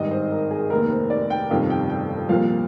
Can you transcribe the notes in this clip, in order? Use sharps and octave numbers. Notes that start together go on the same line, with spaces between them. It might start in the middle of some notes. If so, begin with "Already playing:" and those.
Already playing: G#1 G2 D#3 D#5
C5
A#4
G#4
F1 D#2 D#3 A#4
C5
D5
G5
G1 F2 C3 D#3 F5
G5
G5
C2 A#2 F3 F5